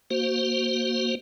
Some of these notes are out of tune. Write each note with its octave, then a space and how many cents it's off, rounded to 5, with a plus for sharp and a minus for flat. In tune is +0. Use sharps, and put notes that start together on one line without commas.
A#3 +0 F#4 +0 C5 +0